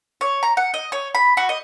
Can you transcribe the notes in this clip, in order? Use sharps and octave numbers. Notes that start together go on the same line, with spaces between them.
C#5
A#5
F#5
D#5
C#5
B5
F#4
D#5